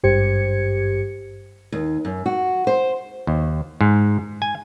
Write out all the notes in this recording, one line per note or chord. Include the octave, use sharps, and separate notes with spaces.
G#1 G2 G4 C5 G#6 C#7
D#2
F#2
F#4
C5
D#2
G#2
G#5